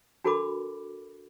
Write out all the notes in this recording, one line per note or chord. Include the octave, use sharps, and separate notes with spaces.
D4 F#4 A4 A#4 B5 D6